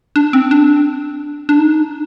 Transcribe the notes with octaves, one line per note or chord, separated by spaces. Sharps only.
D4
C4
D4
D4
D#4